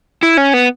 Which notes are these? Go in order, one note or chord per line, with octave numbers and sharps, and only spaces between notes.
E4
C#4
B3